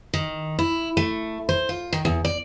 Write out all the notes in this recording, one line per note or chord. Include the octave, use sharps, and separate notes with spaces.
D#3
E4
A3
C5
F4
D#3
E2
D5